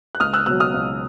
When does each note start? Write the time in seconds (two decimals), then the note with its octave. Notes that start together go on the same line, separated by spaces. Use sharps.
0.15 F#6
0.20 C#2 D#6 F6
0.33 E6 F#6
0.46 B2 F#3 E6 F#6
0.60 D#6 F6
0.74 C#2